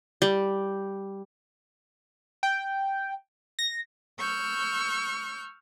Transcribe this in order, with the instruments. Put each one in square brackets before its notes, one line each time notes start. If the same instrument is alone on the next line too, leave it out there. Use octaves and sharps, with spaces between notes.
[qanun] G3
[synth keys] G5
A#6
[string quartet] C#6 E6 F6 G6